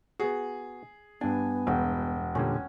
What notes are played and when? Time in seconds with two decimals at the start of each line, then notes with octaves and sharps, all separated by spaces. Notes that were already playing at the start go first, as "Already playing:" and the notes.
0.20 B3 F#4 G#4
1.21 G2 B3 D4 G#5
1.67 E1 F#4 G5
2.35 A#2 D3 G3 C#4